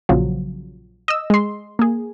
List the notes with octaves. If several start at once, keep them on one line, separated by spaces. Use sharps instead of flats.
A#1 C#3 F3 F#3
D#5 E6
G#3 C6
A#3 G#4